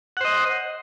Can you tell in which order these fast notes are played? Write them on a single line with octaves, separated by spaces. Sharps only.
F#5 C5 D#5